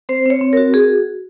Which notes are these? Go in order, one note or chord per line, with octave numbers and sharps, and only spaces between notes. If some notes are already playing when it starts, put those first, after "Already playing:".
C4 C5
C4 C#5
C4
F#4 A#4
F#4 G#4